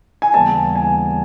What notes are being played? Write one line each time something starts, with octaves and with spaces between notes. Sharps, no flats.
G#5
D#2 C#3 E3 G3 B3 A5
G#5